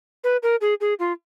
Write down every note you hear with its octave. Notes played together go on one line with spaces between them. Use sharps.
B4
A#4
G#4
G#4
F4